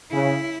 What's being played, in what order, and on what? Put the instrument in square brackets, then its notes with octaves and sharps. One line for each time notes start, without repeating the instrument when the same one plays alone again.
[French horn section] C#3 [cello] E4